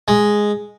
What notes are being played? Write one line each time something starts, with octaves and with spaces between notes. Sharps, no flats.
G#3